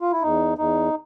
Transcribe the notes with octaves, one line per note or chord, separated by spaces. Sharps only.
F4
E4
E2 D#4
E2 D#4